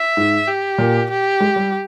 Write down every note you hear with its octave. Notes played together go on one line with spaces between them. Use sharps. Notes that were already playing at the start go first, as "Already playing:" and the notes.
Already playing: E5
G#2
G4
A#2
G4
G#3
G3